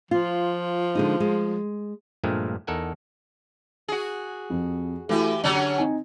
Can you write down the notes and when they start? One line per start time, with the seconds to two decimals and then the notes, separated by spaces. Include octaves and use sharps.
0.11 F3 F4
0.95 D3 G#3 D#4
1.20 G#3
2.24 G2 A#2 F3 G#3 A3
2.67 E2 D#4 A4 A#4 F#5 G#5
3.88 F#4 G#4
4.50 F2
5.09 E3 A3 E4 F#4 G4
5.44 D3 F#3 C#4 D4 G4
5.78 C4 D#4 G#5